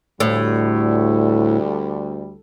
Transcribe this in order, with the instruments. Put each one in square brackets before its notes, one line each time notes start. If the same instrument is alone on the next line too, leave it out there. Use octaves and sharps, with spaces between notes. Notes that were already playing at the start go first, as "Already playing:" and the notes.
[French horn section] D2 G3 [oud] A2